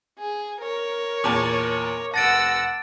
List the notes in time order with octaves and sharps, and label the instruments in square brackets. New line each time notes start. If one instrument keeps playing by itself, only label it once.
[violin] G#4
A#4 C#5
[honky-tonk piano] E2 A#2 A5 [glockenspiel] D6
[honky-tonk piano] F1 A#6 [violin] F#5 E6 [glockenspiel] A5 A6 D7